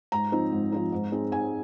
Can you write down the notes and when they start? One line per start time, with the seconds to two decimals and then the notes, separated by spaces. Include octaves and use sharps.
0.12 G#2 A#5
0.32 F3 C4 D#4
0.52 G#2
0.72 F3 C4 D#4
0.92 G#2
1.12 G#3 C4 D#4
1.32 G#2 G#5